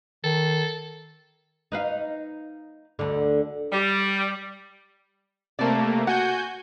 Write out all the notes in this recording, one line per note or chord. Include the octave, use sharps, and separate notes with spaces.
D#3 A4
D#4 B4 F5
D2 D3
G3
C3 A3 A#3 D5 A5
F#4 F#5 G#5 G6